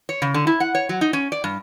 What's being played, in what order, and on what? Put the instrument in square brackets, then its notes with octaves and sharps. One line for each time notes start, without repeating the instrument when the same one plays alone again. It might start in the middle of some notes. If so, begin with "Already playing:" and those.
[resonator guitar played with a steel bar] C#5
C#3
D3
E4
F#5
C#5
F#3
D#4
C#4
D5
G2